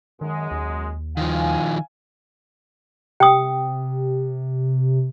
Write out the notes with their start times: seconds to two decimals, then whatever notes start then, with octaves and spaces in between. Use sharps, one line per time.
0.21 F#2 D#3 G#3
0.51 D#2
1.17 D#3 F3 F5 G#5
3.20 C3 G5 D#6